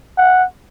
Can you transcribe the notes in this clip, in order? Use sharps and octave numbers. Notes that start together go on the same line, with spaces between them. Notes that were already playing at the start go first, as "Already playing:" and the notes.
F#5